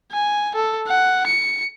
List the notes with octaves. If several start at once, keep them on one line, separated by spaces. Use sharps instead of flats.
G#5
A4
F#5
C#7